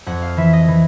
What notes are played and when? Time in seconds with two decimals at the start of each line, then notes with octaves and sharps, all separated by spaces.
0.06 F2 F#5
0.22 F5
0.37 E3 E5
0.53 D#5
0.68 E3